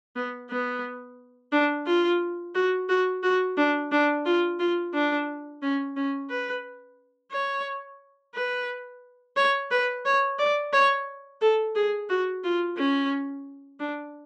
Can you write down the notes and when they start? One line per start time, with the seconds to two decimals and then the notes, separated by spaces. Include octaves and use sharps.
0.16 B3
0.51 B3
1.52 D4
1.87 F4
2.55 F#4
2.89 F#4
3.23 F#4
3.58 D4
3.92 D4
4.26 F4
4.59 F4
4.94 D4
5.63 C#4
5.97 C#4
6.30 B4
7.32 C#5
8.35 B4
9.37 C#5
9.71 B4
10.05 C#5
10.39 D5
10.73 C#5
11.41 A4
11.75 G#4
12.09 F#4
12.44 F4
12.78 C#4
13.80 D4